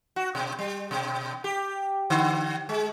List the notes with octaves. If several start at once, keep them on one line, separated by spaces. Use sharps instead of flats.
F#4
B2
G3
B2
G4
D3
G#3